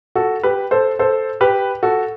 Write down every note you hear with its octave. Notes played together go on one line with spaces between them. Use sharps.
F#4 A4
G4 B4
A4 C5
A4 C5
G4 B4
F#4 A4